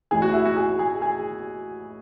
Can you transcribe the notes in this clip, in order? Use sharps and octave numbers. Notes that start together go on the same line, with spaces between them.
A1 A2 E3 G#4
F#4
E4
F#4
G#4
G#4
G#4